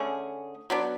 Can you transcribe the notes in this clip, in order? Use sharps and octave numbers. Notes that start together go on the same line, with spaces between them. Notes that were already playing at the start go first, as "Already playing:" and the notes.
Already playing: D3 A3 C#4 G#4
F#3 B3 D4